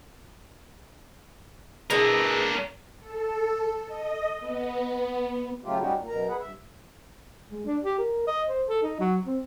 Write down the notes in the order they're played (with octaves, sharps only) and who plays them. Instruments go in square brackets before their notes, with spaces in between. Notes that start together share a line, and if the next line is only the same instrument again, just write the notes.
[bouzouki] B2 E3 G#3 [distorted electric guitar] D4 A#4
[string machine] A4
D#5
B3
[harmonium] C#3 F#3 A3 F4 G4
G3 C#4 D#4 F#4 G4
A#2
F#2 B2 A#4 A#5
G#4 B4 F#5
G2 E5
[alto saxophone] G#3
D4
G4
A#4
D#5
C5
A4
D#4
F#3
C4